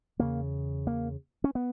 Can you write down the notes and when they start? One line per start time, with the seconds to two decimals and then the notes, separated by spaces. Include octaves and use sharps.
0.19 E2 C#3 A#3
0.87 A#3
1.44 C#4
1.55 B3